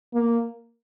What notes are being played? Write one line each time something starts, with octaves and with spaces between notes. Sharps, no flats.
A#3